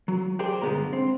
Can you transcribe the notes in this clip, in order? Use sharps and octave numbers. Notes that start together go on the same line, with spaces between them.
F#3
G4 G#4 A#4 C5 D5 G5
G2 D3 E3 G#3 B3 A#5
C4